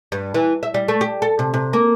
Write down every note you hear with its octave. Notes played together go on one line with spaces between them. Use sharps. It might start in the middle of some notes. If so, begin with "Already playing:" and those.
G2
E3
E5
G3
A3
G4
A4
C3
C3
A#3